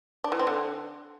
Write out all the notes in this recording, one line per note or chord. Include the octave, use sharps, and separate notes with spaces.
D4
E3
C4
D3